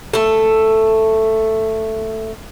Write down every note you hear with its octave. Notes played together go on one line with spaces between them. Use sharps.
A3 A4